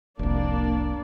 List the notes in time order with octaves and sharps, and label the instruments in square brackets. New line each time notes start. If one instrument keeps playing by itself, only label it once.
[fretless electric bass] F1 C2 [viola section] A#3 D4 D5